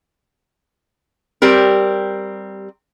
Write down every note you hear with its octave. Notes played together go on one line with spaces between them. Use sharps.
G3 C4 G4 A#4